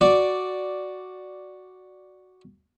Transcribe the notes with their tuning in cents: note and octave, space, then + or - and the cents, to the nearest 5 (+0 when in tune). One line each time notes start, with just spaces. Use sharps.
F#4 +0 D5 +0